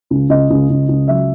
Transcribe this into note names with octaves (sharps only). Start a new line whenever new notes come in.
C#2
C#2 D#5
C#2
C#2
C#2
F#3 E5